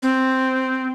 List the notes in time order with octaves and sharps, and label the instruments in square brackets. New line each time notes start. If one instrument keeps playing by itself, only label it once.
[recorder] C4